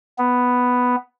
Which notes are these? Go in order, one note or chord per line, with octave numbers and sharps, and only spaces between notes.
B3